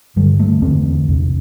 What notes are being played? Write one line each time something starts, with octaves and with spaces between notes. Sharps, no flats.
G2 D3 G3
A3
E2 D3 C4
E2 C3